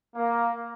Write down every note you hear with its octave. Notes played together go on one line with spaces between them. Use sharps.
A#3